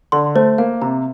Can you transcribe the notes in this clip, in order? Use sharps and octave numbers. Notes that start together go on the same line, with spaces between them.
D3 C6
A3 C5
A#3 F5
C3 A#5